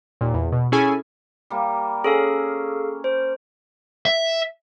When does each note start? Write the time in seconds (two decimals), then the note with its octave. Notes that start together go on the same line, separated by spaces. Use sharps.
0.21 D#2 A#2
0.34 E2
0.52 B2
0.72 C#4 E4 G#4 A4 G#5 B5
1.50 G3 A#3
2.04 C#4 G#4 A4 F5
3.04 C5
4.05 E5